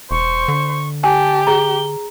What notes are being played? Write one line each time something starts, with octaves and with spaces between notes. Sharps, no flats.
E1 C5 C#6
D3
G4 G#5 A5
G#4 A#5 G7